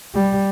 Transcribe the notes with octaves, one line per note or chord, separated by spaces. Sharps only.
G3